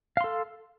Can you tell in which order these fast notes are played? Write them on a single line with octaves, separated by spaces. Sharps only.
F5 C6 A4